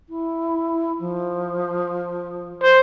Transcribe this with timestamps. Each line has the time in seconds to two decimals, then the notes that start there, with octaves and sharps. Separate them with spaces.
0.09 E4
1.00 F3
2.64 C5